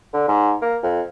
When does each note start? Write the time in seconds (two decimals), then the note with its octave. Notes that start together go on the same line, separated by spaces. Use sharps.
0.14 D3
0.28 G#2
0.62 A#3
0.83 F2